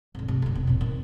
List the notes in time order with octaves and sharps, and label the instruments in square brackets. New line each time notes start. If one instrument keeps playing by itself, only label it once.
[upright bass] G#1 C#3
C3 A3
F#1 D2
E1
A#2 C4
D#3